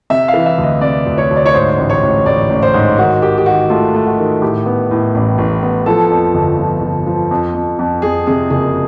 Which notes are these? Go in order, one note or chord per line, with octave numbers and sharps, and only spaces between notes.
C3 E5
F5
E3
E5
D2
D#5
C3 D5
D2
C#5
D2
D5
C#5
G#2 C5
A1
C#5
A1
A1 D5
A1
C5
G#2
D#3 F#4
D#3 G4
G4
D#3 F#4
A3 F4
A3
F#4
D#3
A2 G4
B3
A2
A1
A1
B3
F3 A4
F2
G1
F3
G1
F3
F2
F2
F2
F2 G#4
C3 G#4
F#1 G#4